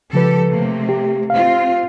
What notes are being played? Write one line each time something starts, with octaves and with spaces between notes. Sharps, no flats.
C#3 F3 G#3 G4 A4 B4
C3 A3 A#3
G4
C4 F4 F5